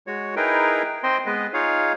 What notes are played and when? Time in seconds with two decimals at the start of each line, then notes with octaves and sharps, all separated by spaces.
0.07 G#3 F#4 C#5
0.36 D#4 E4 G#4 A#4 B4 G5
1.03 C4 C5 D#5 G5 C6
1.26 G#3 B3 B4 D#5
1.54 D#4 F4 G#4 C#5 F5